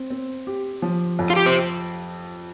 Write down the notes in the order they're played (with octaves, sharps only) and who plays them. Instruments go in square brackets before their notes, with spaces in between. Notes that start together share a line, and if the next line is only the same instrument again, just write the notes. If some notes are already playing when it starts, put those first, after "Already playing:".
Already playing: [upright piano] C4
C4
G4
F3
F2
[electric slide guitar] F4
G4
C5